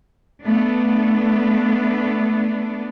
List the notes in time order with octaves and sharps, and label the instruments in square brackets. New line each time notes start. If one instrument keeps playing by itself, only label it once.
[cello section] A3 B3 D4